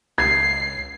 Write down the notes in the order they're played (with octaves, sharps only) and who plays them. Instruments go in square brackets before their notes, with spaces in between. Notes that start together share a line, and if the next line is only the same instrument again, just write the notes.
[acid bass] C#2 [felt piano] G#6 [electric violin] C7